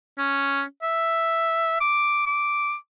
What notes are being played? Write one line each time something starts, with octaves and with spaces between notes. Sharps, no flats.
C#4
E5
D6
D6